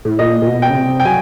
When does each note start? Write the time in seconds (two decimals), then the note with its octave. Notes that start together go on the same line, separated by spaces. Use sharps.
0.05 A2
0.19 A#2 D#5
0.42 A#2
0.48 B2
0.62 G5
0.70 C#3
0.77 C3
1.00 G5
1.05 F#3 G#5